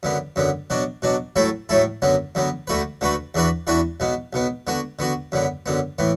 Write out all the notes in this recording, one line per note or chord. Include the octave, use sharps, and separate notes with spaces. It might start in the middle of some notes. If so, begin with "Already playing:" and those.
F#2 D3 B3
F#2 D3 B3
B2 F#3 D4
B2 F#3 D4
A2 F#3 A3 E4 A4
A2 F#3 A3 E4 A4
F#2 D3 F#3 B3
F#2 D3 F#3 B3
D2 D3 A3 F#4 B4
D2 D3 A3 F#4 B4
E2 E3 D4 F#4 B4
E2 E3 D4 F#4 B4
B1 B2 B3
B1 B2 B3
D3 B3 F#4
D3 B3 F#4
F#2 D3 B3
F#2 D3 B3
A2 E3 B3